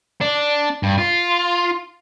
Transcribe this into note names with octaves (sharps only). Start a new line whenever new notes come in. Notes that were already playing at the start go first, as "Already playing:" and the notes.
D4
G2
F4